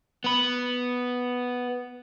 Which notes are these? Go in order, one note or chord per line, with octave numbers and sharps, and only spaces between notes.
B3 B5